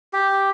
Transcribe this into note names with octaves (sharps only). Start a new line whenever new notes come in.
G4